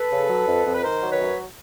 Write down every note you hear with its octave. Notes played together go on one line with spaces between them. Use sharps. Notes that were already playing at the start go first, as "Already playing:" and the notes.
Already playing: A4 B4
C#3
F#3
F2
F2
B4
D#3 A#4 C5
F#3
B4 C#5
F#2